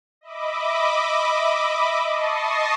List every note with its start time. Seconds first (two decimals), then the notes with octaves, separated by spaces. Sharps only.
0.21 D#5 E5 B5 D6
2.08 D#5 A5 C#6 D#6 A#6 C7